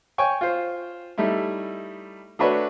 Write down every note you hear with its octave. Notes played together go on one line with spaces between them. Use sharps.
C#5 G5 G#5 C#6
F4 C5
G3 A3 D#4 E4
A3 D4 F#4 B4 C#5